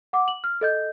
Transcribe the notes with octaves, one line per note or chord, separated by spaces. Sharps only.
F#5 D6
F#7
F6
A4 D#5 G6